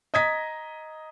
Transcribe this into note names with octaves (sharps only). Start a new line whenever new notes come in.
D#5 A#5 D#6 G#6 A#6 B6